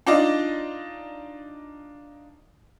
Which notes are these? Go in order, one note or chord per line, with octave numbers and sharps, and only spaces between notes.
D4 D#4 F4 D5 D#5